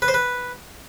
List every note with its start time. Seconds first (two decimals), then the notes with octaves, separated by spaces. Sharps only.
0.02 B4
0.08 C5
0.14 B4